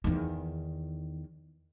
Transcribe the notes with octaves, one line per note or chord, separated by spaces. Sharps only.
E2 D#3